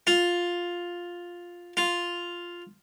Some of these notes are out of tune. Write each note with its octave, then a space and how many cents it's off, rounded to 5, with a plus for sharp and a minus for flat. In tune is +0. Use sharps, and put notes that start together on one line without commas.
F4 +5
F4 +0